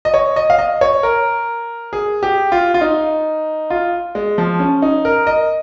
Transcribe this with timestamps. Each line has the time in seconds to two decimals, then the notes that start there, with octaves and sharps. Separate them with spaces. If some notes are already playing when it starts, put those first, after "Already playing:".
0.05 D#5
0.14 C#5
0.36 D#5
0.50 F5
0.58 D#5
0.81 C#5
1.03 A#4
1.93 G#4
2.23 G4
2.52 F4
2.74 F4
2.81 D#4
3.70 F4
4.15 G#3
4.38 F3
4.60 C#4
4.82 D#4
5.05 A#4
5.27 D#5